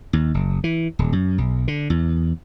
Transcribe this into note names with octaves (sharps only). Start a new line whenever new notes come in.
D#2
F#1
E3
D#1
F#2
B1
D3
E2